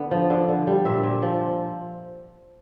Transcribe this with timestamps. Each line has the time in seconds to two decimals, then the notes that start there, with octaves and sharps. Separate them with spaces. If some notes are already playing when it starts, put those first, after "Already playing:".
Already playing: D3 B3
0.11 F3
0.30 D3
0.49 D3
0.67 G3
0.85 A#2 E5
1.03 A#2
1.22 F3